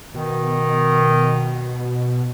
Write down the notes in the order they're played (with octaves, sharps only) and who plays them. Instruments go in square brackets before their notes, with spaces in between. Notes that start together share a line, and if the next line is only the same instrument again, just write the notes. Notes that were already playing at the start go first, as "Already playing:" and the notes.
[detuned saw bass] B2 [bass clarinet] D#3